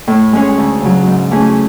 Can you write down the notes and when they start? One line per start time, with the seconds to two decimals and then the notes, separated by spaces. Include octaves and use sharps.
0.07 A2
0.33 G#3 C#4 G#4 C#5
0.58 D2
0.82 C#3 F#3
1.07 G#2
1.31 E3 A3 C#4 G#4